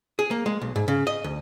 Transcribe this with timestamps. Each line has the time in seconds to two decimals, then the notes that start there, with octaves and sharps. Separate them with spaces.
0.19 G#4
0.31 A#3
0.46 G#3
0.62 B1
0.76 G#2
0.88 C#3
1.07 D#5
1.24 D2